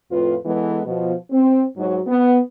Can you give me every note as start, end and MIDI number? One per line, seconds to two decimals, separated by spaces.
0.11 0.34 41
0.11 0.34 45
0.11 0.34 65
0.11 0.34 71
0.46 0.80 52
0.46 0.80 56
0.46 0.80 59
0.46 0.80 69
0.86 1.13 47
0.86 1.13 53
1.31 1.63 60
1.77 1.99 44
1.77 1.99 54
2.07 2.38 59